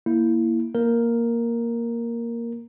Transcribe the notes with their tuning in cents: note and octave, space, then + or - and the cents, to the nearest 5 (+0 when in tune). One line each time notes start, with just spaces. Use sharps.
A#3 +0 E4 +0
A#3 +0 A#4 +0